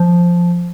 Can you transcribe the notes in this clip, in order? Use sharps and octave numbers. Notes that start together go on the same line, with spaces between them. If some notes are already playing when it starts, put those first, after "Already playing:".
Already playing: F3